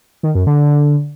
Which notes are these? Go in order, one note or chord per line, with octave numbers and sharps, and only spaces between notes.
D#3
F#2
D3